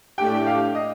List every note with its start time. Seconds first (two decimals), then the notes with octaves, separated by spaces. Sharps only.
0.18 A2 A3 D4 G4 G5
0.47 F5
0.75 D#5